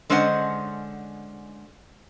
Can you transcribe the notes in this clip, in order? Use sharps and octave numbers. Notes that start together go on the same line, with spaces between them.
D3 G#3 C#4 C5 D#5 F#5